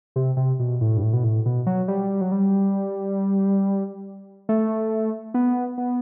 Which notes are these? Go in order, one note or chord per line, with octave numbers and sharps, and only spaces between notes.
C3
C3
B2
A2
G2
A2
B2
A2
B2
F#3
G3
F#3
G3
A3
B3
B3